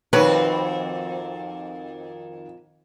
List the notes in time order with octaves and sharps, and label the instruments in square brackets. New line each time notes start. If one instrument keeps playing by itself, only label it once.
[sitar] F2 C4 F#4 [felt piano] D#3 [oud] B4 [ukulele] C#5 B5